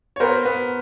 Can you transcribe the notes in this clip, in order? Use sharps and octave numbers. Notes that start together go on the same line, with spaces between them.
C#5
B3 A#4 C5
B3